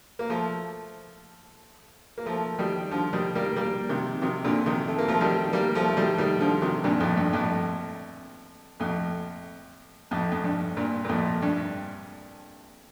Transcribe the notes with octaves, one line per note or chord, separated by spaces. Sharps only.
A#3
F3 A3
A#3
F3 A3
D#3 G3
D3 F3
D#3 G3
G3 A#3
G3 A#3
C3 D#3
C3 D#3
A#2 D3
C3 D#3
A3
A#3
F3 A3
D#3 G3
G3 A#3
F3 A3
A3
D#3 G3
D#3 G3
D3 F3
C3 D#3
G2 A#2
F2 A2
G2
F2 A2
F2 A2
F2 A2
F2
G2
G2 A#2
A#2
F2 A2
G2